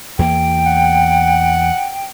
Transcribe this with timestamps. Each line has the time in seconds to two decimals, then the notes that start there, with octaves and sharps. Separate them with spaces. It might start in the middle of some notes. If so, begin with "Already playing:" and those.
0.19 E2 E3 A#3 G5
0.66 F#5